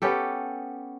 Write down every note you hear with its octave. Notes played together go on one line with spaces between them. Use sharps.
B3 C#4 G4 A4